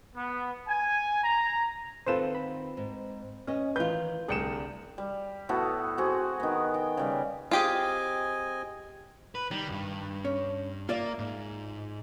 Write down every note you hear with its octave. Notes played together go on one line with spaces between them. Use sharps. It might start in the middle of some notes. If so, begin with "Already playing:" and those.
B3
G#5
A#5
D#3 B3 C4 F4 A4 B4 C5 E7
B5
G#2
B3 C#4 D#5
D#3 E3 F4 B4 G6
C2 D3 A3 G#4 D5 G5 C#7 E7
G3
A2 B3 F#4 A4
C4 F#4 G#4
D#3 B3
G5
C#3 G3
C4 F4 G4 G#4 D#5 G#5
B4
D#3 G3
C#2 G2
C#4
A#3 F4 D5 E5
G#2